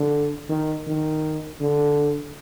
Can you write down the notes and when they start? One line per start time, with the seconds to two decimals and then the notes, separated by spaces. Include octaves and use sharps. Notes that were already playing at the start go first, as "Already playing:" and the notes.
Already playing: D3
0.49 D#3
0.86 D#3
1.60 D3